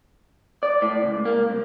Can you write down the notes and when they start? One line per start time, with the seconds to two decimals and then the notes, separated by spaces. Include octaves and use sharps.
0.63 D5
0.82 A2
1.03 C#2
1.25 A#3
1.50 C2